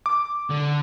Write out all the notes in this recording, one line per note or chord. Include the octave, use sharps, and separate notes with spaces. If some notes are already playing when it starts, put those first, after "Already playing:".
D6
D3